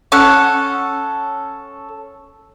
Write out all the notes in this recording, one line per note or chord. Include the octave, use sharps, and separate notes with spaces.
C#4 A4 F#5